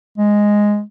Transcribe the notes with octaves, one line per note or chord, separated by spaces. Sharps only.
G#3